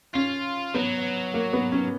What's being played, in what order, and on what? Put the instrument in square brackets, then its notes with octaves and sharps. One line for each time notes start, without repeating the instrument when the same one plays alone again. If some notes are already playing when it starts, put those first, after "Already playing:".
[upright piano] C#4 [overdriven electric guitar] F4
[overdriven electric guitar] F#3 [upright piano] B3
[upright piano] A#3
B3
C#4